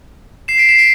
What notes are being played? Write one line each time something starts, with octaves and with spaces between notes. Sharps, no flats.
C7 E7
B6 D7
C7 E7
B6 D7